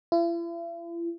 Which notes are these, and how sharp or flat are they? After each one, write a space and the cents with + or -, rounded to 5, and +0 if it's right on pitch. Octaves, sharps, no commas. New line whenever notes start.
E4 +45